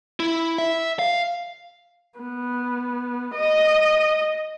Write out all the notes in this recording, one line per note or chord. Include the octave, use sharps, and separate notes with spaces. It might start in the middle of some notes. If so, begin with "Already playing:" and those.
E4
E5
F5
B3
D#5